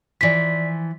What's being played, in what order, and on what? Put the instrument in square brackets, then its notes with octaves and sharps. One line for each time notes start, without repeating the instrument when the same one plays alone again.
[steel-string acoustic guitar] E3 F3 [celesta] D5 B6